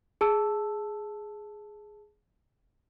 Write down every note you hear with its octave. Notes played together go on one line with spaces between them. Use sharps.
G#4 A5 E6